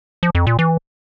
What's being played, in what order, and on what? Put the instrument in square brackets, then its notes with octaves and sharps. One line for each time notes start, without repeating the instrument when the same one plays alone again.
[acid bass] F3
F2
A#2
E3